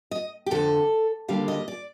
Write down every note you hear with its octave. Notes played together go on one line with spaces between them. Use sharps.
D#5
G4
F2 D3 F3 A4
D#2 D3 G3 A#3 F5
D#5
D5